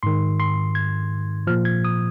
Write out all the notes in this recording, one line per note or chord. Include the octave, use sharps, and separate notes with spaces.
G#2 D#3 C6
C6
G#6
A#2 F3 F6
G#6
D#6